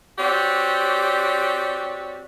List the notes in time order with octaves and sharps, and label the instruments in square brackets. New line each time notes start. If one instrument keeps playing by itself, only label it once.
[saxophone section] C4 F#4 G4 C#5 D5